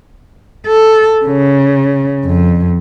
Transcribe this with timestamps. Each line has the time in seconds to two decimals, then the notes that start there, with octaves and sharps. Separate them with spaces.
0.67 A4
1.26 C#3
2.25 F2